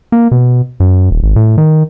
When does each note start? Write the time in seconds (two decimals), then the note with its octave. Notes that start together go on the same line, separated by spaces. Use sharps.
0.12 A#3
0.31 B2
0.80 F#2
1.11 D#1
1.23 G#1
1.36 A2
1.58 D#3